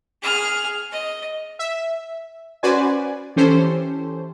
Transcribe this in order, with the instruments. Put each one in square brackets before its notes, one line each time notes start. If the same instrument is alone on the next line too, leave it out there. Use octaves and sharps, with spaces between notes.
[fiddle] G#4 F6
D#5
[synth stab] E5
C#4 F#4 B4 C5 D5 G#5
E3 C#4 G4 A4 C5